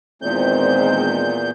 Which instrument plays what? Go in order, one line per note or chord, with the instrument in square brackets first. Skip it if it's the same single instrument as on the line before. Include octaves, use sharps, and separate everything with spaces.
[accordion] E2 A#2 G6 [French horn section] D#3 G#3 C4